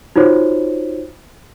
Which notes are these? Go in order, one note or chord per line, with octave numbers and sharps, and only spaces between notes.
D#4 F4 F#4 C5 C#5